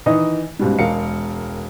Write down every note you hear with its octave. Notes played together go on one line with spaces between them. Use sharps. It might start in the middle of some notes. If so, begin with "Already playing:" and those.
D#3 E3 D#4 D#5
C#2 G#2 B2 G3
E1 G#3 A#4 F5 C#7